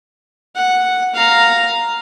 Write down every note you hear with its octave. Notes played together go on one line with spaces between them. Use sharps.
F#5
F5 A#5